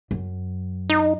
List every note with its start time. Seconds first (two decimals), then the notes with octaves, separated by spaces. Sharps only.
0.11 F#2
0.89 D#4